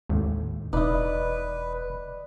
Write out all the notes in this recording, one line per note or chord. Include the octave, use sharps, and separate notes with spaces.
G#1 D#2 A2
E1 D#4 E4 B4 D5 D#5